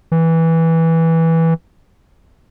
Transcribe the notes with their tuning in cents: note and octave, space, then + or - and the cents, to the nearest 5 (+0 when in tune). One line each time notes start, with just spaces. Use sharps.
E3 -10